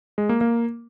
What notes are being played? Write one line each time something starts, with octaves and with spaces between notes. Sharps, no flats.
G#3
A#3
A#3